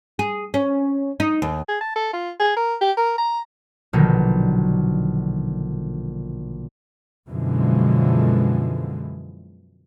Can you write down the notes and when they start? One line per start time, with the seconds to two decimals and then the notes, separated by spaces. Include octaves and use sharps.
0.19 G#4
0.54 C#4
1.20 D#4
1.42 D#2
1.68 G#4
1.81 A5
1.96 A4
2.13 F4
2.40 G#4
2.56 A#4
2.81 G4
2.97 A#4
3.18 A#5
3.93 A#1 B2 D3 D#3 F#3
7.28 F#2 B2 D3 E3 F3 G#3